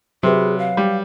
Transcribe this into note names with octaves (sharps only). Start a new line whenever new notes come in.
C3 F#3 G#4 B4
F5
G3